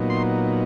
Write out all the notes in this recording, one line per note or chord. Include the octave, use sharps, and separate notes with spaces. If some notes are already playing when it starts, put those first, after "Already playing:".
Already playing: A#2 F#3 B3 D#4
C6